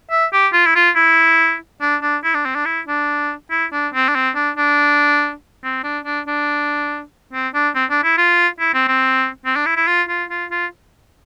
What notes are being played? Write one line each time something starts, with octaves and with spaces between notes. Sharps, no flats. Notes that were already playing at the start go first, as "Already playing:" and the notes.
E5
G4
F4
E4
F4
E4
D4
D4
E4
D4
C4
D4
E4
D4
E4
D4
C4
D4
C4
D4
D4
C4
D4
D4
D4
C4
D4
C4
D4
E4
F4
E4
C4
C4
C4
D4
E4
E4
F4
F4
F4
F4